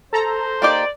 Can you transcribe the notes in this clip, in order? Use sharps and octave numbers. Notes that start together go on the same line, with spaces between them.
A4 C5 A#5
A#3 D#4 G4 D5